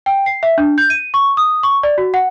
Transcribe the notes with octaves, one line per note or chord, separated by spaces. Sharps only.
G5
C7
E5
D4
G6
D#7
C#6
D#6
C#6
D5
F#4
F#5